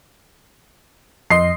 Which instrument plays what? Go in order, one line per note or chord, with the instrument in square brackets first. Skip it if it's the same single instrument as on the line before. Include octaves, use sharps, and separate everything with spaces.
[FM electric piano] F2 D#5 C6 [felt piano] C7